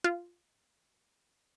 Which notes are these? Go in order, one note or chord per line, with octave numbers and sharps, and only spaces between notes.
F4